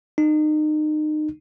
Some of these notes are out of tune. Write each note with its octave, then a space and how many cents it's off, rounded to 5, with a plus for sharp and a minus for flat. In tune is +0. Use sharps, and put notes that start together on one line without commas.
D#4 -30